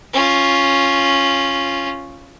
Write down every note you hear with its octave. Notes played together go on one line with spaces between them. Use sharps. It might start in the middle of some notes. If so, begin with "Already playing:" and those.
C#4 F4